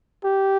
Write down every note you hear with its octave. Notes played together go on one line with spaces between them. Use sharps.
G4